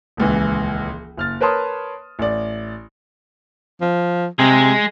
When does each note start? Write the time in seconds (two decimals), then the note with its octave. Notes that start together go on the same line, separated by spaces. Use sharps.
0.17 D#1 C#2 E3
1.17 F#1 F6 A6
1.41 A#4 B4 C#5 A5 C6 D#6
2.19 A1 D5
3.81 F3
4.39 C3 G#3 G#4